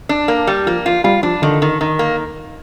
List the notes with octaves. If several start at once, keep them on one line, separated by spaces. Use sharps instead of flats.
D4
A#3
G3
F3 A#3
F3 F4
G3 F4
F3 D4
D3 D#3
D#3
D#3
A#3